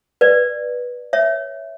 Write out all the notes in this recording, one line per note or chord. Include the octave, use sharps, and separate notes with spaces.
B4 D5
C#5 E5